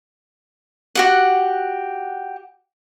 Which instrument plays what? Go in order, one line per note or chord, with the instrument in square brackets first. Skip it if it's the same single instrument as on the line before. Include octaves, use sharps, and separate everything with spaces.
[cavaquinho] F#4 G4 F#5